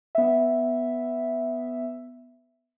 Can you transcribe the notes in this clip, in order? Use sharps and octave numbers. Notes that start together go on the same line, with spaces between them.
B3 E5